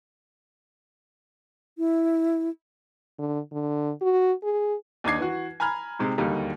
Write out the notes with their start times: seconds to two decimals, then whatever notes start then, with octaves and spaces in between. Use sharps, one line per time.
1.78 E4
3.19 D3
3.52 D3
4.01 F#4
4.43 G#4
5.04 D#2 D4 D#4 D6 G#6 C7
5.18 E3 F#4
5.60 G#5 A#5 B5 F6 G#6
5.99 C3 G#3 C4 D#4
6.18 D1 D#2 D3 G3 A#3 D#4